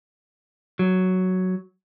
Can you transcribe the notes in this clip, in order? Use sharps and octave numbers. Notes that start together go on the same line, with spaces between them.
F#3